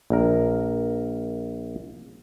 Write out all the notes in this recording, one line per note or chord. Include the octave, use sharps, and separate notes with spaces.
A#1 A#4